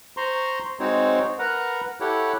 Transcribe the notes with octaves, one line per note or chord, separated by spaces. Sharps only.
C5 A#5 C6 C#6
G#3 C4 D#4 F#4 C5 C#5
A#4 B4 F#5 A#5
E4 G4 A4 C#5 F#5